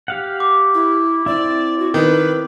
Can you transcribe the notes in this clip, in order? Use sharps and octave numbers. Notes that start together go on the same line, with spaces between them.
G4 F5 F#5
D6
E4
C4 E4 D5
F#4
D#3 B4